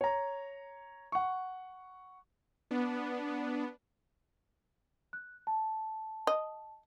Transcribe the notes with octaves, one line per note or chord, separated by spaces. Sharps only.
C#5 A#5
F#5 C#6
B3 D4
F#6
A5
D#5